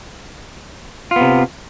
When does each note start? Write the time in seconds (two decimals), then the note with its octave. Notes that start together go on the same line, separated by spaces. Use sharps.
1.11 F4
1.16 B3
1.21 C3